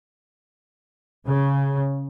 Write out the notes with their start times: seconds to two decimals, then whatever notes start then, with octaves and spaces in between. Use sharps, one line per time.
1.26 C#3